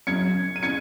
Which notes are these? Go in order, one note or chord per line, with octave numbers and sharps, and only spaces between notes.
F#2 C#3 G#6 C#7
D#7
C#3 G#6 C#7